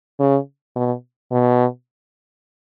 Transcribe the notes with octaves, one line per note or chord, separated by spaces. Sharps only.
C#3
B2
B2